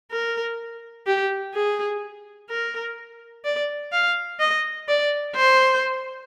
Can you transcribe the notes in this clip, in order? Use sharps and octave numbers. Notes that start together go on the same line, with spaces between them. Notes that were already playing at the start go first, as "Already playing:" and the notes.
A#4
G4
G#4
A#4
D5
F5
D#5
D5
C5